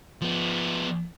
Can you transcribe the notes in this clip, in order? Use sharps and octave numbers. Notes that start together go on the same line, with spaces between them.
F3 B3